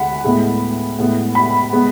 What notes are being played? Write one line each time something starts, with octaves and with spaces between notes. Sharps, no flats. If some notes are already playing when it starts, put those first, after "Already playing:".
Already playing: D2 D3 G#3 F#5 B5
A2 G#3 B3
A2 G#3 B3
B5
G#3 B3